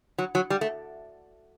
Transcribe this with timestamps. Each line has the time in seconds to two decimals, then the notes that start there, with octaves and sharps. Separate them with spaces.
0.18 F#3
0.35 F#3
0.50 G3
0.61 A3